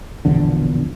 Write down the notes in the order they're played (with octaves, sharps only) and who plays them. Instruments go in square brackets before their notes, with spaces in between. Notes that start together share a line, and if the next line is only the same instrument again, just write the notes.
[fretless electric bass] E1 A#1 E2 D3